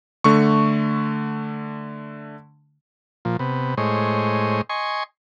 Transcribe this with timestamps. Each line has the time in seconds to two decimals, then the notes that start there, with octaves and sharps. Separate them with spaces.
0.24 D3 A3 C#6
3.25 A#2 F3
3.39 C3 B3
3.77 A2 G#3 C5 C#5 D#5
4.69 D#5 G#5 C6 C#6